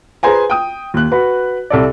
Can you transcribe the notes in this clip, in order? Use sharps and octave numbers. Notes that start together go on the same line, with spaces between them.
G#4 B4 C5 G#5 A#5
G5 D#6
D#2 F#6
F#4 B4 B5
C2 A4 D5